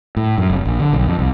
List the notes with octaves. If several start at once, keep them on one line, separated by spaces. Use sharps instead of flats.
A2
F#2
F1
A#1
D3
B1
F2
C2